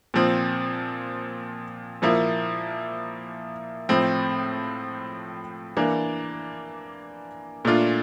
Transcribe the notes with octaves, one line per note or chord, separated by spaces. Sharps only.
A#2 F3 C4
A#2 F3 A#3 E4
A2 F3 C4
E3 A#3 D4
A#2 A3 D4 F4